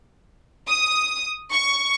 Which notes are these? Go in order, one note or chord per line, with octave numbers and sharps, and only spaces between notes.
D#6
C#6